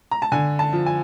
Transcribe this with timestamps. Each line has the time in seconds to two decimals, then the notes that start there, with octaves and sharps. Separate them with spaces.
0.11 A#5
0.22 A5
0.32 D3 G#5
0.59 A5
0.73 F3
0.86 G#5